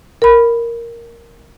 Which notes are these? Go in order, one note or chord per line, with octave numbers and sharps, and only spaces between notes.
A#4 B5